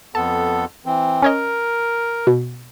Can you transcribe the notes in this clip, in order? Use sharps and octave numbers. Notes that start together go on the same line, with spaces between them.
F2 B3 A4 A5
E3 C4
C#4 A#4 C#5 D#5
B2